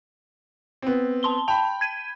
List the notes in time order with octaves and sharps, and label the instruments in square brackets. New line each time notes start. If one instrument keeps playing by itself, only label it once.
[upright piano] B3 C4
[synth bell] A5 C6 G7
[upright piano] G5 B5 [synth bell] A5
[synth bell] G#6 D#7